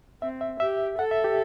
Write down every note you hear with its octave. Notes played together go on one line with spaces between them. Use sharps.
C4 E5
E5
G4 E5
A4 F#5
E5
G4